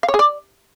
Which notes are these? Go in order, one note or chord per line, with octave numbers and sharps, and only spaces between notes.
F5
C#5
G#4
D5